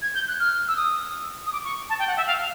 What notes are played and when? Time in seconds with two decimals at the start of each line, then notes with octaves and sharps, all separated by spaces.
0.02 G#6
0.14 G6
0.28 F#6
0.40 F6
0.68 E6
0.77 D#6
1.46 D#6
1.52 D6
1.64 C#6
1.89 A5
1.99 G5
2.07 F#5
2.17 E5
2.26 F5